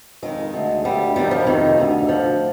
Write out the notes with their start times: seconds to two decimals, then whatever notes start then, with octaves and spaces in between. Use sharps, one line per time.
0.22 F2 D#3 G#3
0.53 D2 D3
0.84 D2 D3 G3
1.15 F2 C3 D#3 G3
1.31 F3
1.46 F2 C3 D#3
1.77 D2 D3
2.09 D2 D3 F3